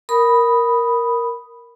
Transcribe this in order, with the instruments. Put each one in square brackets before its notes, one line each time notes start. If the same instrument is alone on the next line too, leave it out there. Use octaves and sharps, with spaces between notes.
[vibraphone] A#4 B5 D#6